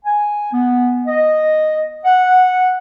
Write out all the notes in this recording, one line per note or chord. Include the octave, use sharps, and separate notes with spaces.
G#5
B3
D#5
F#5